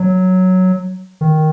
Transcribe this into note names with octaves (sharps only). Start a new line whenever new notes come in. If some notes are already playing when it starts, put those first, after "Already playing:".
Already playing: F#3
D#3